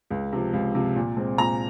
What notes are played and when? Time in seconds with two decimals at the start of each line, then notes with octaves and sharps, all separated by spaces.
0.11 C#2
0.33 C3 F3
0.53 C#2
0.75 C3 F3
0.96 A#2
1.16 G#3 C4
1.38 A#2 A#5